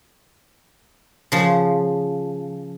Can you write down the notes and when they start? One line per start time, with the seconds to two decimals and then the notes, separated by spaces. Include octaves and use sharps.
1.32 C#3 F3